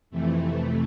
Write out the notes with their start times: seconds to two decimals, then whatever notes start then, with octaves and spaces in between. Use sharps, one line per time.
0.10 F2 C3 E3 A3